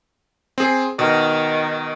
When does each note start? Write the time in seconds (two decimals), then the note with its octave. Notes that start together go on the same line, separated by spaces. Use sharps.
0.58 C4 G#4
0.99 B2 D#3